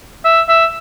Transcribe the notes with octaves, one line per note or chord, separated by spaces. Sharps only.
E5
E5